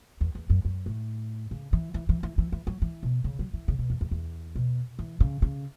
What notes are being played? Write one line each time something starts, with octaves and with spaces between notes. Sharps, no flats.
E2
E2
F#2
F#2
A2
C#3
E3
E3
E3
E3
E3
E3
F#3
E3
B2
C#3
F#3
E3
C#3
B2
E2
E2
E2
B2
E3
C#3
C#3